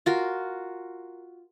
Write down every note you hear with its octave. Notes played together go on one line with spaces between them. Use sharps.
F4 F#4 A#4